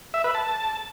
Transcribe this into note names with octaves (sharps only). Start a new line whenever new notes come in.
E5
B4
A5